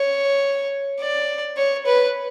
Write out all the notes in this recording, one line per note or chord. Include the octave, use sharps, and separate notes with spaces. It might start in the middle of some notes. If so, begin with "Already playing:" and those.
Already playing: C#5
D5
C#5
B4